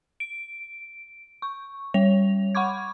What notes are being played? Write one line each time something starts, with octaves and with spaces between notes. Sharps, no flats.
D7
C#6
G3 C#5 F7
F#5 B5 C#6 D6 G#6